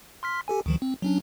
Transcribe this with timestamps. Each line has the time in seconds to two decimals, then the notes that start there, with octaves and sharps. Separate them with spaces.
0.23 C6 F6 B6
0.48 G4 A4 G#5
0.66 D2 D#3 F3
0.82 C4
1.02 F#3 C#4 D4